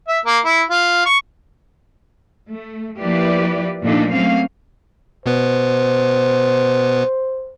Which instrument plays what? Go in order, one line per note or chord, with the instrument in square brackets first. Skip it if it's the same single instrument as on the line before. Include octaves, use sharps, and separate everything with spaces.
[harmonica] E5
A#3
E4
F4
C#6
[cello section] A3
F3 A#3 E4 G4 B4 D5
A#2 F3 A3 D4 D#4 A4
F#3 A3 A#3 C4 C#4 F5
[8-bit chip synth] B2 B3 B4 [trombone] C5